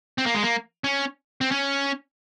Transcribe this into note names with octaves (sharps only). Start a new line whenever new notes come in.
C4
A#3
G#3
A#3
C#4
C4
C#4